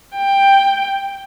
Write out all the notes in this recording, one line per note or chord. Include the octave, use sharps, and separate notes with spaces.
G5